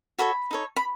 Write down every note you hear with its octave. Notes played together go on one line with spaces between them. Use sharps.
F#4 A4 C#5 B5
D#4 A4 C#5
B5